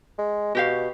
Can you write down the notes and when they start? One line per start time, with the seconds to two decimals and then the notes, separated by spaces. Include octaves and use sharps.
0.18 G#3
0.55 B2 F#4 G4 F5